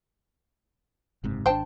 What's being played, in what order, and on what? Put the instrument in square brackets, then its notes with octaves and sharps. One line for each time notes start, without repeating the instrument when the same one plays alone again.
[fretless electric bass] F#1 G#2 C3
[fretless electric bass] G#1 D3 D4 [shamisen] C5 G5 A5